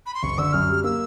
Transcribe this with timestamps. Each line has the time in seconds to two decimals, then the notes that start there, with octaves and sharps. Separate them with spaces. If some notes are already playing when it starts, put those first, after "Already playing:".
0.06 B5
0.14 C6
0.23 F#1 C#6
0.38 D3 E6
0.53 F#2 F6
0.69 G3
0.84 A#3 E6